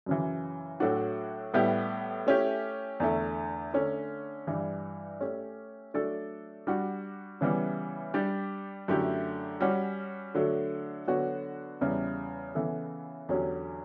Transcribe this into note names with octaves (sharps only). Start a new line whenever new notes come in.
F#2 C#3 E3
A2 F#3 A3 D4 F#4
A2 G3 B3 E4 G4
A3 C#4 E4 G4
E2 D3 A3 E4
D3 A3 C#4
G2 E3 G3
A3 C#4 G4
F#3 A3 D4 A4 D5
G3 D4 F#4
C#3 E3 G3 B3 E4
G3 D4 G4 D5
F#2 D3 A3 E4 G4
G3 C#4 F#4
D3 F#3 A3
D3 F#3 B3 F#4 C#5
E2 C#3 G3 B3 E4
C#3 E3 B3 E4 A4
E2 D3 F#3 C#4 G4